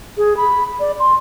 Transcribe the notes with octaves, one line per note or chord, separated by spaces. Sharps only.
G#4
B5
D5
C6